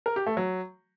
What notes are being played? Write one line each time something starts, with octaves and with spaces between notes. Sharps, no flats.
A#4
G4
A3
F#3